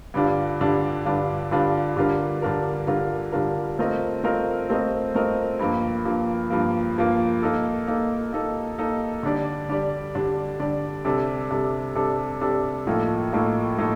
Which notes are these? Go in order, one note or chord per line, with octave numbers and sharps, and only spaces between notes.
G2 D3 G3 D4 F4
G2 D3 G3 D4 F4
G2 D3 G3 D4 F4
G2 D3 G3 D4 F4
D3 G3 D4 F4 A#4
D3 G3 D4 F4 A#4
D3 G3 D4 F4 A#4
D3 G3 D4 F4 A#4
A3 C4 F4 A#4 D#5
A3 C4 F4 A#4 D#5
A3 C4 F4 A#4 D#5
A3 C4 F4 A#4 D#5
G2 F3 A#3
G2 F3 A#3
G2 F3 A#3
G2 F3 A#3
A#3 D#4 A4
A#3 D#4 A4
A#3 D#4 A4
A#3 D#4 A4
D3 G3 D4 G4 D5
D3 G3 D4 G4 D5
D3 G3 D4 G4 D5
D3 G3 D4 G4 D5
C3 G3 D4 A4
C3 G3 D4 A4
C3 G3 D4 A4
C3 G3 D4 A4
A2 F3 A#3 D#4 A4
A2 F3 A#3 D#4 A4
A2 F3 A#3 D#4 A4